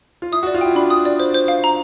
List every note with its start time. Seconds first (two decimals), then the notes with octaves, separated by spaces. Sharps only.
0.22 F4
0.32 E4 D#6
0.43 F#4 D5
0.54 F4
0.61 E4 G5
0.75 D4 B5
0.90 D#6
1.05 D5
1.20 C5
1.34 C5
1.48 F5
1.64 A#5